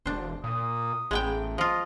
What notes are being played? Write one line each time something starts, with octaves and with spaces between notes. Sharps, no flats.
E1 D4 C5
A#2 D#6
A1 G#3 B3 G5
F3 F4 D#5